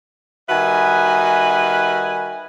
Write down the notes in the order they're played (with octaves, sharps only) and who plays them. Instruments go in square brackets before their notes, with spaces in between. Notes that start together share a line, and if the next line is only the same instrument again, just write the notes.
[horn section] D#3 G3 F#4 B4 E5 G#5